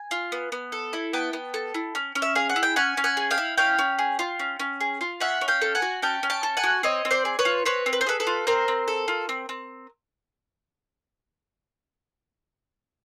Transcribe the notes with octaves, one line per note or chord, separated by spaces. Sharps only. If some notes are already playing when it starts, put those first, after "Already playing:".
Already playing: G#5
F4
B3
B3
A4
E4
B3 G5 A5
B3
A4
E4
C#4
C#4
E5
G#4 F5
F#5
E4
G5
C#4 F#5 G#5
C#4
F#5 G#5
G#4
F5 G5
E4
C#4 F5 G5
C#4
G#4
F4
C#4
C#4
G#4
F4
C#4 E5 F#5
C#4
F5 G5
A4
F#5 G#5
F#4
C#4 G5 A5
C#4
G5 A5
A4
F#5 G#5
F#4
C4 C#5 D#5
C4
C5 D5
G#4
B4 C#5
F4
C4 B4 C#5
C4
B4
C5
G#4 A4 B4
A4 B4
F4
C4 A#4 C5
C4
A4
F4
C4
C4